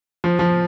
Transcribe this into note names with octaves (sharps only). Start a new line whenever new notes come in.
F3
F3